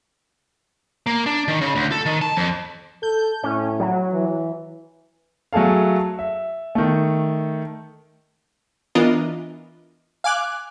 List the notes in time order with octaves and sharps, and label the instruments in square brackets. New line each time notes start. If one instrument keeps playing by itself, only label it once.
[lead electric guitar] A#3
D4
D#3
C#3
D2
A4
D#3
A5
F2
[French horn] A4 [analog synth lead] G6
[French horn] A2 [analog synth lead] C#4
[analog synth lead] F#3
[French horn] E3
[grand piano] F#3 A3 G#4 A4 F5
E5
D#3 A3
[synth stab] E3 B3 D4 F4 A#4 D#5
F5 G#5 D6 F#6